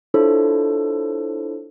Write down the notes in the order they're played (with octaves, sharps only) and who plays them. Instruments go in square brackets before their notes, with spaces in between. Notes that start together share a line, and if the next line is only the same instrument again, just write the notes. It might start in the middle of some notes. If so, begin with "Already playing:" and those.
[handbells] D4 E4 F4 A4 C5 C#5